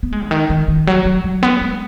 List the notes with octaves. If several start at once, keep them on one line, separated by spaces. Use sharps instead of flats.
B3
G#3
C#3
D#3
D#3
D#3
F#3
F#3
F#3
B3
G#3